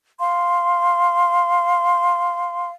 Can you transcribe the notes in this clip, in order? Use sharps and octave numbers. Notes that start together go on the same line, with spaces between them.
F5 C6